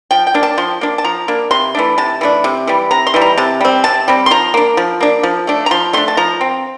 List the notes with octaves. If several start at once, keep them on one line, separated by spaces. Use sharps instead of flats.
F3 G5
G5
A#3 D4
A5
F3 C6
A#3 D4
A5
F3 A#5
A#3 D4
C3 C6
E3 A3 D4
C3 A5
E3 A3 D4
C3
E3 G3
C3 A#5
C6
E3 G3
A#5
C3 A5
G3 C4
C3 A5
G3 C4
C6
F3 A#5
A#3 D4
F3
A#3 D4
F3
A3 D4
A#5
F3 C6
A3 D4 C6
A5
F3 A#5
C4